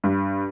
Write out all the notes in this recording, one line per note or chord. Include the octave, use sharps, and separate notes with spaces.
G2